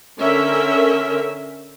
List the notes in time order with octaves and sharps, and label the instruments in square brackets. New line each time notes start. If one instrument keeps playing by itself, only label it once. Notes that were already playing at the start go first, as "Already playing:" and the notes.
[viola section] D3 C#4 A#4 E5